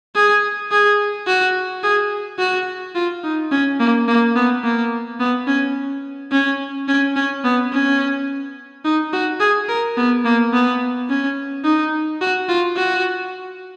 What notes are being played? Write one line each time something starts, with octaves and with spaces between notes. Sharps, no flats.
G#4
G#4
F#4
G#4
F#4
F4
D#4
C#4
A#3
A#3
B3
A#3
B3
C#4
C#4
C#4
C#4
B3
C#4
D#4
F#4
G#4
A#4
B3
A#3
B3
C#4
D#4
F#4
F4
F#4